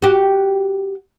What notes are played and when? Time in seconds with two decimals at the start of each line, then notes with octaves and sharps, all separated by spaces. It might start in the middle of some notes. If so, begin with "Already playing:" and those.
0.02 F#4 G4